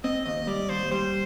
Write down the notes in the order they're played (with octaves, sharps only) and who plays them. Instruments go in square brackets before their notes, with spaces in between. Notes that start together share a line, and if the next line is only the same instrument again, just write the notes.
[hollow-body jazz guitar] C4 [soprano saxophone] D#5
[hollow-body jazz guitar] D#2 [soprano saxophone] D#5
[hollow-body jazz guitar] G3 [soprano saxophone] D5
[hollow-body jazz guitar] D#2 [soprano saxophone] C5
[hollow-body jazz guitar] G3 [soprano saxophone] C5